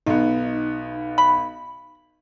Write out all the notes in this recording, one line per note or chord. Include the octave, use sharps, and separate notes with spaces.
B1 B3 D#4
B5